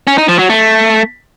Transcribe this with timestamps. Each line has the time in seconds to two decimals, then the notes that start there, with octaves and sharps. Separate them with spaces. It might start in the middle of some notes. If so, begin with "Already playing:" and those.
0.07 C#4
0.18 D#4
0.28 F3
0.39 F#3
0.49 A3